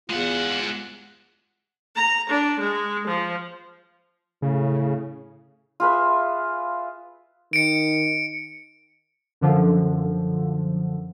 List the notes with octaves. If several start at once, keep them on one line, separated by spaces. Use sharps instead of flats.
E2 G#3 F4 F#5
A#5
D4
G#3
F3
A2 C#3
F4 G#4 B4 E5
D#3 C#7 D7
F#2 D3 F3